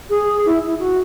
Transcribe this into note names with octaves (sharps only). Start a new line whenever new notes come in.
G#4
E4
E4
F#4